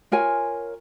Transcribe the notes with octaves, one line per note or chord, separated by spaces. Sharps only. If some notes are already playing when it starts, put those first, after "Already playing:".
F4 A#4 C#5 G#5